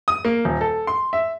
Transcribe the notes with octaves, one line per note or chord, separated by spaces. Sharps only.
D#6
A#3
D#1
A4
C6
E5